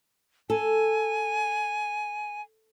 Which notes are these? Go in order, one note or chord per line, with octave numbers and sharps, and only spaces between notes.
A4 G#5